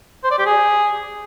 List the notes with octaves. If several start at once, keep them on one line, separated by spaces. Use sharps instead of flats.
C5
D5
G4
G#4